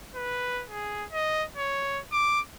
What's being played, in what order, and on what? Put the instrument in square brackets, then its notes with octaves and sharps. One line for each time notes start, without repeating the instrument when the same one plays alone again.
[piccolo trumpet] B4
G#4
D#5
C#5
D6